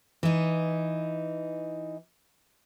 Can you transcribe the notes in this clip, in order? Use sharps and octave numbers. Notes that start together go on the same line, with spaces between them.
E3 D#4